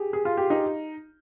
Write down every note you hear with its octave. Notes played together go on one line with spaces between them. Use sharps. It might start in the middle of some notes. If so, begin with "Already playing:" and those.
Already playing: G4 G#4
G#4
F4
G4
D#4